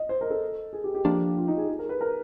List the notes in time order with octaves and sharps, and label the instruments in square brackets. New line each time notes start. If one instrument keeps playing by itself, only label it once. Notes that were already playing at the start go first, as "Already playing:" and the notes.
Already playing: [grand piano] D#5
C5
A#4
A4
G#4
G4
G4
[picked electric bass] F3 A#3 D4
[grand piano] F4
D#4
G#4
G#4
A#4
B4
A#4